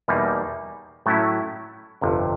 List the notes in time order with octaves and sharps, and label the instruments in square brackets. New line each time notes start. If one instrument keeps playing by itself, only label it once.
[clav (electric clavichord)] E2 B2 G3 A#3 D#4
A2 F#3 A3 C#4 E4
G1 F2 C3